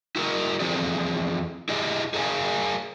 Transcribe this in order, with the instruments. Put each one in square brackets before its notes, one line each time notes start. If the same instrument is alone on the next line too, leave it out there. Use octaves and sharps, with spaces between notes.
[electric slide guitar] E4 F#4 A#4
E2 F3 C4 G#4 D5
E4 G4 G#4 D#5
G#4 A#4 C#5 D5 F5 G#5